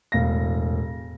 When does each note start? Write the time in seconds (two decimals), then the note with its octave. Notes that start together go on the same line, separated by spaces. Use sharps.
0.12 E1 A2 F5 A#6